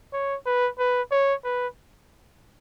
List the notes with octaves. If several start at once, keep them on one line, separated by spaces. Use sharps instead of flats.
C#5
B4
B4
C#5
B4